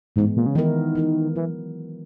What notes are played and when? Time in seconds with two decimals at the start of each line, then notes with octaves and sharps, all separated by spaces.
0.16 G#2 E3 G#3 B3
0.36 A#2
0.46 C#3
0.55 D#3 E3 B3 E4 A#4
0.95 E3 B3 E4 A#4
1.36 D#3 E3 F#3